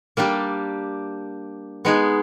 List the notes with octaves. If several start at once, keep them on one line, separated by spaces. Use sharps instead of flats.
G3 A#3 D4 G4
G#3 B3 D#4 G#4